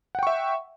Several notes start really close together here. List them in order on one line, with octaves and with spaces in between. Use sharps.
F#5 G5 C#6 E5